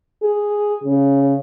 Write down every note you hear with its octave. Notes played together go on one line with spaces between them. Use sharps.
G#4
C#3